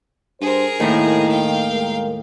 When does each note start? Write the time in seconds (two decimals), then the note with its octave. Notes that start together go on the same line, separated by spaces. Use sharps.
0.41 G2 G#4 A#4 C5
0.80 D#2 A2 D#3 E4
1.29 F5 G5
1.70 G#3 A#4